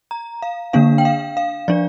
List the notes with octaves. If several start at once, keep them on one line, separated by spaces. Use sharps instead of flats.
A#5
F5
D3 A#3 D4 F5
G5
F5
F5
F3 D4 D5